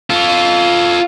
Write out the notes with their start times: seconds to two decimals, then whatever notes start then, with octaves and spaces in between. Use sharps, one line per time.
0.10 F4 A4